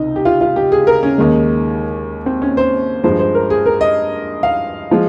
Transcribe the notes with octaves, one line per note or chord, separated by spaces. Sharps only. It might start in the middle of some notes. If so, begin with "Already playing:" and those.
Already playing: C#2 C3 D#4
G4
F4
F4
G4
G#4
A#4
C#4
D#2 D#3 G#3
C4
C#4
C5
G2 F3 G#3 C5
C5
A#4
G#4
A#4
D#5
F5
F3 G#3